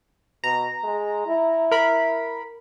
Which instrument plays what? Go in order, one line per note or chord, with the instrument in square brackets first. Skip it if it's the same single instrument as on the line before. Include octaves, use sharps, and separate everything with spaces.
[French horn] B2 [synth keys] A#5
[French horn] G#3
E4
[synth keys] A#4 B5